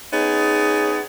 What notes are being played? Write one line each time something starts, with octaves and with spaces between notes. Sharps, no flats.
B3 C#4 D#4 G#4